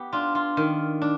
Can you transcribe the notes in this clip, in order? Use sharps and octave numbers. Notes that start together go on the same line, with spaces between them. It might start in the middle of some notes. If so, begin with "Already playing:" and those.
Already playing: B3 G4
D4 F4
F4
D#3
D4